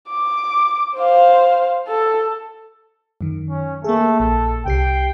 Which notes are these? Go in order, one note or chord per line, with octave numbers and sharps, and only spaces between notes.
D6
C5 F5
A4
F#2 D#3
C#4
A3 A#3 G#4
A#1 A4
C2 G4 G5 C7